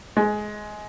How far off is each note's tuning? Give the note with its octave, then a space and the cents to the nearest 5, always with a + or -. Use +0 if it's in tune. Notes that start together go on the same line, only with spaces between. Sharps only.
G#3 +15